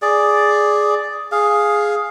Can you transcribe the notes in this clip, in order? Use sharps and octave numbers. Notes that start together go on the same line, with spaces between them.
G#4 D5
G#4 F5